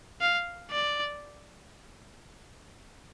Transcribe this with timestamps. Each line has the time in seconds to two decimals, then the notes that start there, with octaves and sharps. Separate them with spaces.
0.21 F5
0.71 D5